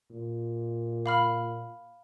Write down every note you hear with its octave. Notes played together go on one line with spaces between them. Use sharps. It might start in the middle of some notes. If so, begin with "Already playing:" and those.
A#2
F5 B5 F6